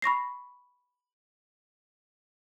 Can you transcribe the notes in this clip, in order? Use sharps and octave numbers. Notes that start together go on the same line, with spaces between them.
B5 C#6 A#6 C7